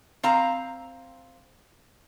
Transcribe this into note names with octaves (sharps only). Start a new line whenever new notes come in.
C4 F5 A#5